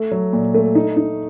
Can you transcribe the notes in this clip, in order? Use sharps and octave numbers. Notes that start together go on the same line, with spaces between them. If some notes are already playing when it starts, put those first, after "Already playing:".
Already playing: A3
F#3
A#2
A3
D#4
D#4